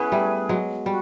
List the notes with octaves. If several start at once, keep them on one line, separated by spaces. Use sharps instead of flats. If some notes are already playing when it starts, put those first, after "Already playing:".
Already playing: B3 C#4 E4 G#4 B4
G3 A3
F#3 G#3
G3 F#4